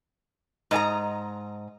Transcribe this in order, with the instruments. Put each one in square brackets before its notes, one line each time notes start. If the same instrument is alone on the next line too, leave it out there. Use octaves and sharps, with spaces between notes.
[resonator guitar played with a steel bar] G#2 D#5 A5 A#5